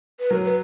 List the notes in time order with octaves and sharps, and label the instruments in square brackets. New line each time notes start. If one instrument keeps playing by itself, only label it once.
[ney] B4
[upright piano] F#3 [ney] A#4
[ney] B4